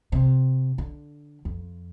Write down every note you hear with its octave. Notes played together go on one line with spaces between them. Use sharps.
C3
D3
F2